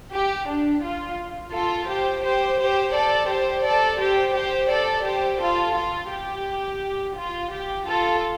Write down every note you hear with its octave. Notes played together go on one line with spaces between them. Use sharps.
G4
D4
F4
F4 A4
G4 C5
G4 C5
G4 C5
A4 D5
G4 C5
A4 D5
G4 C5
G4 C5
A4 D5
G4 C5
F4 A4
F4
G4
F4
G4
F4 A4